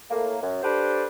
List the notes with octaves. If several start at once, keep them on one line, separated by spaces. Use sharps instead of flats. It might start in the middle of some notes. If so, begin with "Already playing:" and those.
A2 A#3
F#2
D4 G4 A4 B4 C5